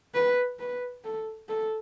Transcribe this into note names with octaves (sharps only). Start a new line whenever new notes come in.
B4
B4
A4
A4